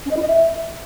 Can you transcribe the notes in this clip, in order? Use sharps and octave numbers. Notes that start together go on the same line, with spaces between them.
C#4
D#5
E4
D#5
E5